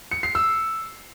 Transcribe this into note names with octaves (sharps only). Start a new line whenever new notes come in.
C#7
C7
E6